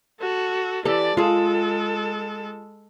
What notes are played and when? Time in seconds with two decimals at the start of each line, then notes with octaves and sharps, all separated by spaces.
0.20 F#4 A4
0.85 E3 G4 A4 D5
1.17 G#3 F4 G#4 A4